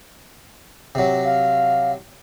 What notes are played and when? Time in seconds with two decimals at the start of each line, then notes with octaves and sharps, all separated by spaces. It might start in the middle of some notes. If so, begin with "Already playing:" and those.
0.95 C3 F#3
1.25 F5